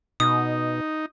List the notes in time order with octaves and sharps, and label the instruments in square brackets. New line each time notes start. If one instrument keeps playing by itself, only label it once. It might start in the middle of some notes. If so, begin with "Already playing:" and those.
[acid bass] B2 [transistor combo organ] D#4 [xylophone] D#6